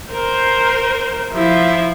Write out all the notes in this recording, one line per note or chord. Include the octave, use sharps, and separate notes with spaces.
A#4 C5
F3 E4